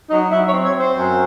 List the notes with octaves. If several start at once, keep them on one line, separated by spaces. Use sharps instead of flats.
F#3 D#4
F#3 E4
C#5
C4
C#5
C4 C5
F#2